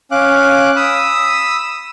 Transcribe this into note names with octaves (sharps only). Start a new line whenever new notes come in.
C#4 F5 D6 F#6
B5 D#6 E6